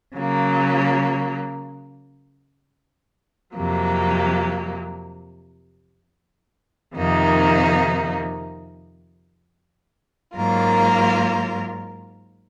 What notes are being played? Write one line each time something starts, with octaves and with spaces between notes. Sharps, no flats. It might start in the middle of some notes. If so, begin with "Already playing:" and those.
C#3 F#3 A#3
F2 C3 F#3 A#3
F2 C3 D#3 A#3 D#4
G#2 F#3 A#3 F4 A#4